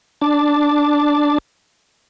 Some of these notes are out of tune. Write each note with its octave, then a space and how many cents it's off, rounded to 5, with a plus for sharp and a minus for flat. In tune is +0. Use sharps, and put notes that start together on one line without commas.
D4 +0 A5 +0